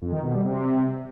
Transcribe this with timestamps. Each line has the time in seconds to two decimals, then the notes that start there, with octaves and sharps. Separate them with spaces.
0.02 F2
0.12 D#3
0.23 B2
0.34 G3
0.44 C3